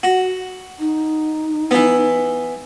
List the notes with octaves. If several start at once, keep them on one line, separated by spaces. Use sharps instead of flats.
F#4
D#4
E3 B3